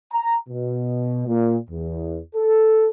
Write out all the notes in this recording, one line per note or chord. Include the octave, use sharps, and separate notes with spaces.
A#5
B2
A#2
E2
A4